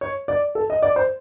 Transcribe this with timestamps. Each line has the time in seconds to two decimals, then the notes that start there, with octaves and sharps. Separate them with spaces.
0.01 C#5
0.28 D5
0.55 A4
0.70 D#5
0.82 D5
0.96 C5